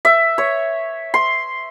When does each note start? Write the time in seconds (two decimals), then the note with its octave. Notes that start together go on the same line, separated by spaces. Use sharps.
0.05 E5
0.38 C#5
1.14 C6